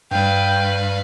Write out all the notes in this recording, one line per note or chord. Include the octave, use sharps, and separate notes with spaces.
G2 G3 B4 F5 G5